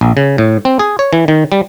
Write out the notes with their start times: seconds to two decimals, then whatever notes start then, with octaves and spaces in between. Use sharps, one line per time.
0.01 A#1
0.17 C#3
0.38 A2
0.65 C4
0.79 G#4
0.99 C#5
1.13 E3
1.28 D#3
1.52 G3